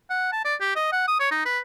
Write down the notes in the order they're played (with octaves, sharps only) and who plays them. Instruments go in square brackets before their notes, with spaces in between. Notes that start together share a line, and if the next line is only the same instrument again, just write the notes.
[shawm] F#5
A5
D5
G4
D#5
F#5
D#6
C#5
D#4
B4